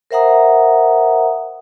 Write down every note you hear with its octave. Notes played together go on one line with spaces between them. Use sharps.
A#4 C5 E5 F#5 A#5 D#6